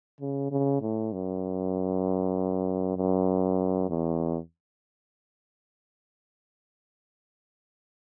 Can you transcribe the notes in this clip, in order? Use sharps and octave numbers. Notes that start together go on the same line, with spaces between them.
C#3
C#3
A2
F#2
F#2
E2